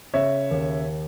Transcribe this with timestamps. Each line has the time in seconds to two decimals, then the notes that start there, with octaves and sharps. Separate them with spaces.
0.14 C#3 C#5 E5
0.51 D#2